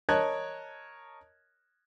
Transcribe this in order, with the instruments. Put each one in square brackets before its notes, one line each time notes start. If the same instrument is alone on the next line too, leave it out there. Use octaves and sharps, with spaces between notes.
[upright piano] A#4 C#5 D#5 A5 F#6 G#6